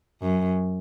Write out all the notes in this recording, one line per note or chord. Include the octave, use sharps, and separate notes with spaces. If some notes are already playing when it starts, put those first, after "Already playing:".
F#2